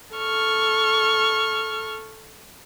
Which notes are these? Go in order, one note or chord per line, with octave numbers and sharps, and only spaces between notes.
A4 C#6 F6